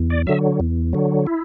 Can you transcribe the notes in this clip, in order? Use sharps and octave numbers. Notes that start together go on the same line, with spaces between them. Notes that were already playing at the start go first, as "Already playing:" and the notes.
Already playing: E2
D5
D3 F#3 E5
E2
D3 F#3
E4